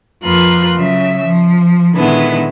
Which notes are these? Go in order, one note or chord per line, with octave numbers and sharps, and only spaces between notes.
F2 A#3 F4 A#4 B4 F#6
C#3 F#3 E5
F3
A#2 D3 D#3 G#3 B3 E4